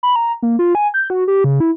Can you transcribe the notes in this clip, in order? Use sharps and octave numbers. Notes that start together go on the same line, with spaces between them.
B5
A#5
A#3
F4
G#5
G6
F#4
G4
C#3
E4